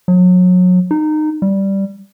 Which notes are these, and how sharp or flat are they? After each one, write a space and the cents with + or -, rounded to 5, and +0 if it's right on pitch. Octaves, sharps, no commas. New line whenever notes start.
F#3 -30
D#4 -20
G3 -5